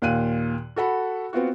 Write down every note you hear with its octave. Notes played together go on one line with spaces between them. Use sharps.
D#2 A#2 F5 F#6 D#7
F#4 A4 F#5 B5
B3 C4 F4 F#4